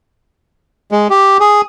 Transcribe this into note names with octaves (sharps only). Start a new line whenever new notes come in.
G#3
G4
G#4